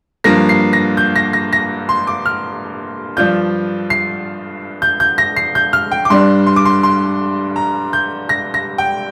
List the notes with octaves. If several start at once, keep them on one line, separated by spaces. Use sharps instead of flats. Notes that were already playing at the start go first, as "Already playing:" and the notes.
G2 F3 A#3 A#6
C7
A#6
G6
A#6
A#6
A#6
C6
D6
F6
G2 F3 D4 F4 G6
C7
G6
G6
A#6
C7
G6
F6
G5
D6
G2 G3 D4 C6
C6
D6
C6
C6
A#5
G6
A#6
A#6
G5